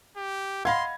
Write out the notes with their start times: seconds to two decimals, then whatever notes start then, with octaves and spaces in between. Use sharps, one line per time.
0.17 G4
0.65 D#5 F5 F#5 B5 C6 G#6